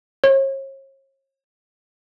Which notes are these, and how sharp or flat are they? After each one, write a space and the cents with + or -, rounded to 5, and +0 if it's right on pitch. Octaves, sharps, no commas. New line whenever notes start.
C#5 -40